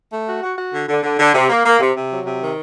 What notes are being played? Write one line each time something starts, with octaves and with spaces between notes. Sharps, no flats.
A3
F#4
F#4
F#4
D3
D3
D3
D3
C3
A#3
A#3
C3
C3
F#3
C3
D#3